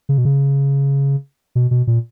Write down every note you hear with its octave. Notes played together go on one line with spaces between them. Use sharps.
C#3
B2
C#3
B2
B2
A#2